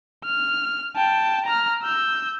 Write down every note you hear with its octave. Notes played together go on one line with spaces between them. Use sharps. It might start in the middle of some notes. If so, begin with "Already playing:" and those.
F6
G5 A5
A#5 F6
E6 G6